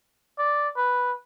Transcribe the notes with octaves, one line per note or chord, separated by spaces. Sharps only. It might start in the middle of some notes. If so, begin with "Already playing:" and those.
D5
B4